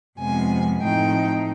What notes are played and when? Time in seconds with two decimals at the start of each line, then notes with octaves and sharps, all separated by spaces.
0.19 F2 C3 F3 G#3 B3 G#5
0.82 A2 F3 A3 C4 D#4 G5